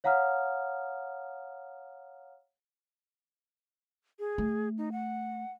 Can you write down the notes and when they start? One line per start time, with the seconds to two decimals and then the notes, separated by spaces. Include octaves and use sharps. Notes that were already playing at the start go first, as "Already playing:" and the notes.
0.04 C#5 F5 F#5 A#5 D#6 F6
4.19 G#4
4.38 A3
4.78 D#4
4.92 F#5